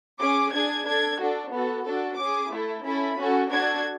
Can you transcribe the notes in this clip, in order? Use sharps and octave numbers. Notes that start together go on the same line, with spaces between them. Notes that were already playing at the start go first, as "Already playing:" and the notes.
C#4 G#4 D6
D4 G#4 G#6
D4 A4 G#6
D4 F#4 A4
B3 F#4 A4
D4 F#4 A4
C#4 G#4 D6
A3 E4 A4
C#4 E4 A4 B5
C#4 F#4 A4
D4 F#4 A4 G#6